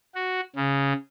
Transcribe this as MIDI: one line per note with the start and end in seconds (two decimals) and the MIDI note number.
0.15 0.40 66
0.56 0.93 49